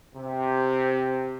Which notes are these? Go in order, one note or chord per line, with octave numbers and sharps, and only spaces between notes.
C3